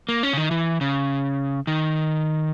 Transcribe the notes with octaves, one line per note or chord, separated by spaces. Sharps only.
A#3
C#4
C#3
D#3
E3
C#3
D#3